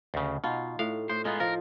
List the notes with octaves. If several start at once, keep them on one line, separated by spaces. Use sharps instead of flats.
D2 C#3
B2 D#4 F4
A2 F5
A2 C5
G#3 B3 D#4 F4
F3 A#4